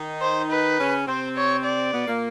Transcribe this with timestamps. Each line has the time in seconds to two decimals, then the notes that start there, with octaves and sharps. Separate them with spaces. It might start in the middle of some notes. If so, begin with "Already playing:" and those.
Already playing: D#3 D#4
0.22 C5
0.51 B4
0.79 C#3 C#4
1.07 C3 C4 C5
1.36 C#5
1.64 D5
1.93 B2 B3
2.07 A#2 A#3